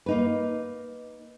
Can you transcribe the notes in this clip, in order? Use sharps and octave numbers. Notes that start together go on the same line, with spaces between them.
A#3 D#4 B4